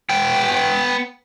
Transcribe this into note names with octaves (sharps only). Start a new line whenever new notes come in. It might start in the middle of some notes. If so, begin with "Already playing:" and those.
B3 G5